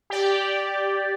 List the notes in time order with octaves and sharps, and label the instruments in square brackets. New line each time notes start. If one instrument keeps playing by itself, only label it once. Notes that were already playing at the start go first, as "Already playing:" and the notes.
[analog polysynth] G4 D5